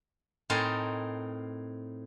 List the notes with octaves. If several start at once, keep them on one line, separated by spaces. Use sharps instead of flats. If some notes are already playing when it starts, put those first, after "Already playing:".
A2 C4 D#4 A#4 G#5 A5